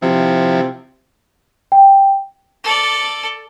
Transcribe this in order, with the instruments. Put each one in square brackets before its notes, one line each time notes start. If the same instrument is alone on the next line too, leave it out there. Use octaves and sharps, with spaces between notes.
[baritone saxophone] C3 [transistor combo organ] F3 E4
[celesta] G5
[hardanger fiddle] A4 D5